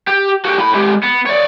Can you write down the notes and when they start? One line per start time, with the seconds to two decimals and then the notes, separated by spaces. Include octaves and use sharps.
0.08 G4
0.45 F#4 G4
0.58 A2 B5
0.74 G#3 G4
1.03 B3
1.26 C#5 D5